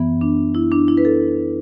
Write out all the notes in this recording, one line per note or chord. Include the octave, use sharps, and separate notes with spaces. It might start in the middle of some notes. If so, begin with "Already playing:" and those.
Already playing: F#2 E3 B3
D4
E4
D4
E4
B4
A4